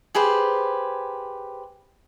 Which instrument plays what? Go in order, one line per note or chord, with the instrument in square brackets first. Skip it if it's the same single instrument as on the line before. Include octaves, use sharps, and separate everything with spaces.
[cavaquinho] G4 G#4 B4 C5